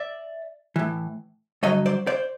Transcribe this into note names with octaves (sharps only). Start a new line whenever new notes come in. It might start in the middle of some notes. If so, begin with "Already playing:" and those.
Already playing: D5 E5
A2 E3
G2 D3 F#3 C#5 D#5
C5 D5
C5 D5